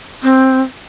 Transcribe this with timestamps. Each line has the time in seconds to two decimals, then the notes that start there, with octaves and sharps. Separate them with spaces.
0.23 C4